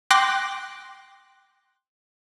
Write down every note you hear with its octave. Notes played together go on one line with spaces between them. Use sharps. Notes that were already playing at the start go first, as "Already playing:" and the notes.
G5 C6 D6 F#6 A#6 D7